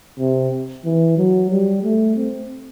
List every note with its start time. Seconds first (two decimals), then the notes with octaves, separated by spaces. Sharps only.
0.19 C3
0.85 E3
1.18 F#3
1.51 G3
1.83 A3
2.16 C4